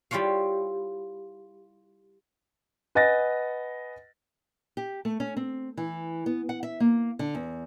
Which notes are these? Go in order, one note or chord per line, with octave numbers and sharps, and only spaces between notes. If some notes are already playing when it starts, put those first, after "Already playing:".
G3 E4 F4 C#5 F5
B4 D#5 F#5 G#5 A6 A#6
G4
A3
C#4
C4
E3
B3
F#5
E5
A#3
D3
E2